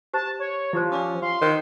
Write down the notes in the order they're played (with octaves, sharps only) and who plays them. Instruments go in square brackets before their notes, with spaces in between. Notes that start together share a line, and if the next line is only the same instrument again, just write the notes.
[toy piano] G4 C5 [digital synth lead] A5
[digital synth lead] C#5
[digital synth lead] F3 [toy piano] E4 G4 C5
[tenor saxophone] C#4 [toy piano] D5 D6 D#6
[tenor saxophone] F4 [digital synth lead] C6
[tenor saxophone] D#3 [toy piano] F4 A#4 C5